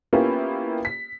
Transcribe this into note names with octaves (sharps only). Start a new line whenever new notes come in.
A#3 B3 C#4 E4 F4 G4
B6